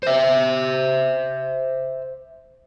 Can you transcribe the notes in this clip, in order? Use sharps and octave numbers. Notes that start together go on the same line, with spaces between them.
C5 E5